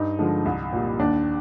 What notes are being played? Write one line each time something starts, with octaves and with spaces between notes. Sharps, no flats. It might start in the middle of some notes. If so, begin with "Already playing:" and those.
Already playing: G2 D#4
D3 F3 G#3
C2
A#2 G3
D#2 D4